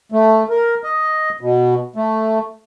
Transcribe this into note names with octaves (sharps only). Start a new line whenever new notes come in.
A3
A#4
D#5
B2
A3